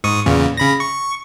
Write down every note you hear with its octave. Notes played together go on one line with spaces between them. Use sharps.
G#2 C#6 D#6
E2 A#2 C#3
C#3 B5 A#6
C#6